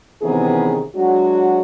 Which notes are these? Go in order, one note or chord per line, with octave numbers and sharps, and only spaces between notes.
C3 D#3 E3 B3 C#4 G#4
F#3 G#3 D4 F#4